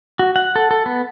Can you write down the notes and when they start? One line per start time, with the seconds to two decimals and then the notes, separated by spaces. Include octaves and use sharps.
0.19 F#4
0.36 F#5
0.56 A4
0.71 A4
0.86 B3